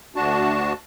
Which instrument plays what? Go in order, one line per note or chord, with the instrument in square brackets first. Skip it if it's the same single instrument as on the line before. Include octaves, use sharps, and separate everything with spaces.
[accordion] D2 D4 F#4 A5